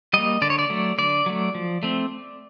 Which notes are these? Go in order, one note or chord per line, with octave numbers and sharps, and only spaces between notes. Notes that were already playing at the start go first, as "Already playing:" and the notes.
G3 A#3 D#5
D3 D5
C#5
D5
F#3 A3
D3 D5
F#3 A3
F3
A3 C4